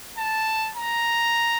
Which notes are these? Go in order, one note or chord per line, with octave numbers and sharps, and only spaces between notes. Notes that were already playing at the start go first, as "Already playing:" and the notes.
A5
A#5